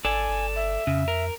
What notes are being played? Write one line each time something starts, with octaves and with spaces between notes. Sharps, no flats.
G#1 A4 D5 G#5
G1
E5
F2 C#3
A#4